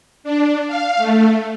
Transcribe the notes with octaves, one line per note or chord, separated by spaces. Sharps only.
D4
F5
A3